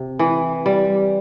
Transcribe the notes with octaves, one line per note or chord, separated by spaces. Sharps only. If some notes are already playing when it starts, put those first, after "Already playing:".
Already playing: C3
E3
G3